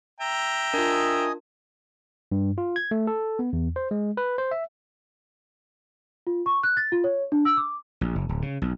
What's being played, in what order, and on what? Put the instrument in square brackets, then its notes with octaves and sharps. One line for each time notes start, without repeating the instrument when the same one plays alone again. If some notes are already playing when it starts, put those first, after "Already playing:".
[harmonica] E5 G5 A#5
[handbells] D4 F4 [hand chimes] A#4 [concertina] D#5 G#5 D#6
[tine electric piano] G2
F4
G#6
A3
A4
B3
E2
C5
G#3
B4
C5
E5
[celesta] F4
C#6
F#6
A6
F4
C#5
D4
E6
D6
[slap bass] A#1
F#1
D1
C#3
B1